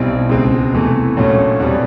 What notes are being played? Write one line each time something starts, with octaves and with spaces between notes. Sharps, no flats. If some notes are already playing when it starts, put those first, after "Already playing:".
Already playing: B1 B2 G3 C4 E4
C#2 B2 G#3 C4
E2 C3 E3 A3
A#1 A#2 F#3 A3 C#4
E2 B2 G3 C4